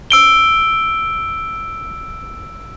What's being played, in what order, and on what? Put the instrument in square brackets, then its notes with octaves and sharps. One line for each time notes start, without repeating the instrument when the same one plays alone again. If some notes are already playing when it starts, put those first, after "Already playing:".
[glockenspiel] E6 D7 G7